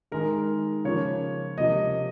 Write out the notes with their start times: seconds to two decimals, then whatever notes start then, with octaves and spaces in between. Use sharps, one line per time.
0.12 D#3 G#3 A#4
0.85 C#3 F3 A#3 C#5
1.58 C3 F3 A#3 D#5